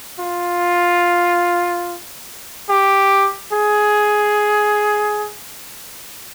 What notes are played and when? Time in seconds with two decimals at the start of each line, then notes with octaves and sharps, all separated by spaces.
0.20 F4
2.70 G4
3.53 G#4